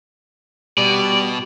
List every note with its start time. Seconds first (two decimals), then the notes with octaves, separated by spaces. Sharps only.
0.78 B2 G3 D5